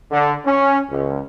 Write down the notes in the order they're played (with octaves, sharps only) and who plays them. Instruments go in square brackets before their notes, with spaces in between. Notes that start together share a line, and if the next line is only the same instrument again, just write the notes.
[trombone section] D3
C#4
C#2